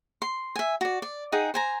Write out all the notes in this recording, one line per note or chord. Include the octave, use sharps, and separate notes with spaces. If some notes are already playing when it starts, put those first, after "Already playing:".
C6
E5 G#5
F#4 D5
D5
D#4 G#4 F#5 G5
C5 G#5 A#5